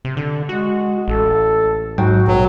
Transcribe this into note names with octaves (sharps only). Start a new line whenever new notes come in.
C3
D3
G#3 F#4
A1 A4
G#2 F#3 F#4 G5
A#1 B2 F#3